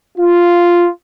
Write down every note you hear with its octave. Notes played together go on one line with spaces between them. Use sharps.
F4